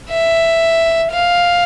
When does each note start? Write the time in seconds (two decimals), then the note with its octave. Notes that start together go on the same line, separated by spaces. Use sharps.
0.10 E5
1.12 F5